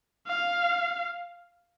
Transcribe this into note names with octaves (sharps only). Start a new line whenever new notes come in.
F5